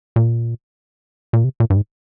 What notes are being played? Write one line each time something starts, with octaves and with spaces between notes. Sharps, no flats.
A#2
A#2
C3
A#2
G2
G#2